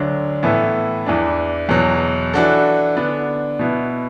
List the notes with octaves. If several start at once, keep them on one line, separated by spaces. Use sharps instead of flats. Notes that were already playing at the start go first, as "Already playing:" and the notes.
Already playing: D2 D3 F#3 D4
A2 E3 B3 E4 A4
E2 E3 D4
E2 B2 F#3
E3 D4 F#4 A4
D3 B3 D4
B2 B3 E4